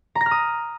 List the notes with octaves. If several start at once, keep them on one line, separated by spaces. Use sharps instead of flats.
A#5
A#6
F6
D#6